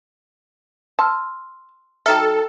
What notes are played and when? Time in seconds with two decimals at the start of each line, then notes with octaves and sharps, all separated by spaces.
0.99 A5 C6 E6 F6
2.06 F#3 D#4 A4 E5 G5 A#5 F6